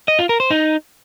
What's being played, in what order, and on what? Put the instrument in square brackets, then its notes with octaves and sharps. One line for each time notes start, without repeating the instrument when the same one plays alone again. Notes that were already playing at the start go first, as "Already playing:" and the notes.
[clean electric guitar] D#5
F4
A#4
C5
D#4